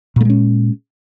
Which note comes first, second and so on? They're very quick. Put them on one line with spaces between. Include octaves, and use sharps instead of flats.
A#2 A3 G#3 C#4